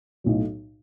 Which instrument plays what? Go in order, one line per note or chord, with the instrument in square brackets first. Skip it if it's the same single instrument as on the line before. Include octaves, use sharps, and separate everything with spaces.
[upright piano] B1 A2 F#3